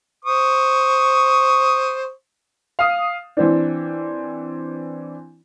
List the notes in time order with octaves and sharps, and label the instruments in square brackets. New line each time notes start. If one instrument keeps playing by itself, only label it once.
[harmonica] C5 C#6 D#6
[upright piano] F5 D#6
E3 C4 D4